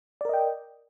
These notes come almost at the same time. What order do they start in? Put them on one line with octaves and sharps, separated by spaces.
D5 A#4 D#5 G5